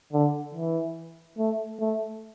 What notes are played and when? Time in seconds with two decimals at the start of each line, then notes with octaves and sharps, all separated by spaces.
0.13 D3
0.54 E3
1.38 A3
1.80 A3